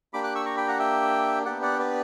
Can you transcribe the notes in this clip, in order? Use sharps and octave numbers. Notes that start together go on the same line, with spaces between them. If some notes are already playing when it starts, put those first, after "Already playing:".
A#3 D4 G4 B5 D6
D6 F#6
C#6 E6
A#5 C#6
G5 B5
F#5 A#5
E5 G5
B3 D4 G4 D5 F#5
D5 F#5
B4 D5